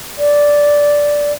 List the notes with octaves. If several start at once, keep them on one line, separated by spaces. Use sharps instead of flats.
D5